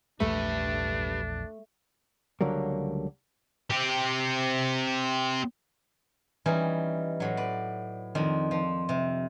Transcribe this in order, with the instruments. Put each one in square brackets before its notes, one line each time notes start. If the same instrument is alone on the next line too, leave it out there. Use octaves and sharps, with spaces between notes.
[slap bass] A#1 E2 F3 [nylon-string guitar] A3 [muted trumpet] D4 [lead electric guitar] G4 B4
[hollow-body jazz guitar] C#2 D3 F#3 G3 A#3
[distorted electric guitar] C4 G4
[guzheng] E3 G3 C#4 D#4
A2 F#3
B4 D5
F2 D#3 D4
F3
C3